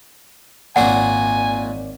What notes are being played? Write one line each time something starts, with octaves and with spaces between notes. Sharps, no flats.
G#1 A#2 A#3 F#4 C#5 D5 F#5 G#5